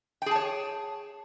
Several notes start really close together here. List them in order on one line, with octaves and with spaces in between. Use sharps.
G5 G#4 A5 C#5